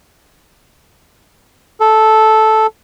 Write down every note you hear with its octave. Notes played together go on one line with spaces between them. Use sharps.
A4